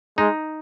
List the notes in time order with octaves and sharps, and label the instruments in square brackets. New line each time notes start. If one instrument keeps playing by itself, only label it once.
[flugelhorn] G#3 [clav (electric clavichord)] D#4